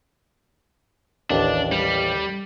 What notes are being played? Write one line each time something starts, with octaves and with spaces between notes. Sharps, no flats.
A1 D#2 D4
G3